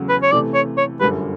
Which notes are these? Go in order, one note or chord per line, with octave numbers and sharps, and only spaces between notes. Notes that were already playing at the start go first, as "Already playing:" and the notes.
Already playing: E2 C#3 F#3 A3 C#4
B4
C#5
C3 E3 A3 D5
C#5
C#5
G1 F#2 D3 G3 B4